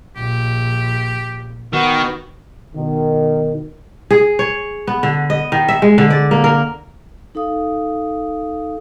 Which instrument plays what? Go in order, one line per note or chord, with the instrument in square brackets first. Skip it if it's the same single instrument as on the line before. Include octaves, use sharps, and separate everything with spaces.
[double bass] A#1 [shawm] G4
[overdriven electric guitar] D#3 [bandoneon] B3 F#4
[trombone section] B2 D#3
[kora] G#4
C#5
B3
D3
D#5
D#3
E5
G#3
D3
D5
A#3
A#4
[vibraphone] D#4 A4 F5 D#6